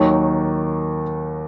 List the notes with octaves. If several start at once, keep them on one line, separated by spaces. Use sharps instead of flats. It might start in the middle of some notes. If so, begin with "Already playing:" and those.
Already playing: D#2 D#3 F#3 D#4